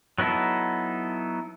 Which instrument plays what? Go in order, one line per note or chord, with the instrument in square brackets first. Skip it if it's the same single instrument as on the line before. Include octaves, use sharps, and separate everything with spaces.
[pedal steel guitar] F#3 B3 D#4 E4 A4